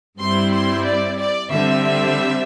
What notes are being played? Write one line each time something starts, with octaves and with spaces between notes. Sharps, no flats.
G2 G3 C4 E4 C6
C6
D5
D5
D3 G3 C4 E5